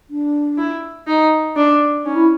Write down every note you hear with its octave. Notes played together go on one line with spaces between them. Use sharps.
D4
E4
D#4
D4
C#4 D#4
E4